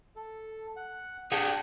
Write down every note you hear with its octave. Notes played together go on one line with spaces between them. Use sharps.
A4
F#5
D4 G4 G#4 F#5 G5